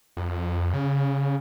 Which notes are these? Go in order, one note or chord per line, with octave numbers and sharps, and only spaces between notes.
F2
C#3